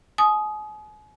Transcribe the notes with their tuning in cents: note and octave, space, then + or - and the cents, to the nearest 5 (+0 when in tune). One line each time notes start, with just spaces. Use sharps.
G#5 +40 D#6 +0